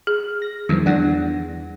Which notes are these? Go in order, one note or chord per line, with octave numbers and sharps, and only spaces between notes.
G#4
A#6
E2 D#3 F3 G3
E2 D4 F#5 A#6